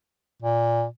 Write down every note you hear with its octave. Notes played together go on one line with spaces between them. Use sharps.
A#2